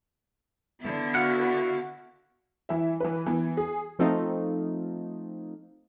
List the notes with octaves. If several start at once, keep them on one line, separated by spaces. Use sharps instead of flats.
D3 B3 E4
F#4 F5 F#5
E3 E4 E5
E3 B4
E3 B3
G#4
F3 A3 C4 D#4 F4